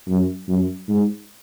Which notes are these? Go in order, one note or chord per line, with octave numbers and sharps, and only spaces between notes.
F#2
F#2
G#2